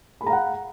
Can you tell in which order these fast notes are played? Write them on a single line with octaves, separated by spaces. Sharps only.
B5 G#4 A#5 F5 F#5